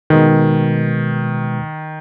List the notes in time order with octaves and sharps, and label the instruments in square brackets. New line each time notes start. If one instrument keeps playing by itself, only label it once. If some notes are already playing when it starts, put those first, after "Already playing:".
[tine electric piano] B2 G#3 B4 [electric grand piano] D#3